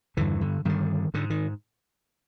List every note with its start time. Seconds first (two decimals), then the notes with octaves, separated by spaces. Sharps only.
0.17 E2 G2 D3 E3
0.41 D3
0.65 G2 D3 D#3
1.14 G#2 D3
1.30 D#3